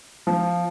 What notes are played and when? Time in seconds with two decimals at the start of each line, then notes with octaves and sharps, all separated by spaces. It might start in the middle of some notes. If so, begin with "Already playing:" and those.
0.27 F3